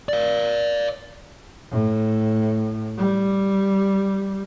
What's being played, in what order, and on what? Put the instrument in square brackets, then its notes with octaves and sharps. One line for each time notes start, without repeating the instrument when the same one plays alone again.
[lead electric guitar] D5 F5
[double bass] A2
G3